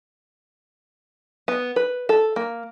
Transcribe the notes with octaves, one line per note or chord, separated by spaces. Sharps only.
B3
B4
A4
A#3